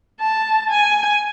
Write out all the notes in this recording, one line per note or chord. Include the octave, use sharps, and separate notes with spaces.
A5
G#5